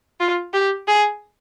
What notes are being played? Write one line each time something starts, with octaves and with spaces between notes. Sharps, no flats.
F4
G4
G#4